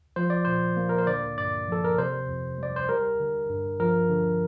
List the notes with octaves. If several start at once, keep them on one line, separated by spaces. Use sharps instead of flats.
F3 C5
D5
A#2 C5
A#3
A#4
C5
D3 D5
G2 D5
F3 A4
A#4
C3 C5
F2
G3 D5
C5
G3 A#4
D3
G2
F3 A#4
D3